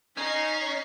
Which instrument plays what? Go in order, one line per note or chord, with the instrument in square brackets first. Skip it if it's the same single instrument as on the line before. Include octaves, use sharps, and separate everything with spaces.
[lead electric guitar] C#4 [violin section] D#4 C7